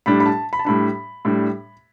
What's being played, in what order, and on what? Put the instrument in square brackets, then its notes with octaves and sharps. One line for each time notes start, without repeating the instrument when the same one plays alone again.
[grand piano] A2 G3 D4 B5
B5
A5
B5
A5
A2 G3 D4 B5
A2 G3 D4